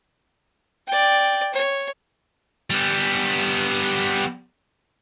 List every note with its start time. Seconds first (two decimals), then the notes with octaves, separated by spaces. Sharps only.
0.87 D5 G5
1.54 C#5
2.70 G3 B3